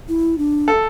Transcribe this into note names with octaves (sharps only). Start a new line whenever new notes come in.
E4
D4
A4